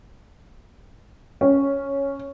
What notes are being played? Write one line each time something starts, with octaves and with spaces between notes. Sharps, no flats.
C#4